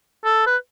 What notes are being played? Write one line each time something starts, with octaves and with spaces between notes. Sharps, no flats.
A4
B4